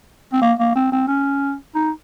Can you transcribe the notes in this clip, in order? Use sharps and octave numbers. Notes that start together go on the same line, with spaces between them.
C4
A#3
A#3
C4
C4
C#4
D#4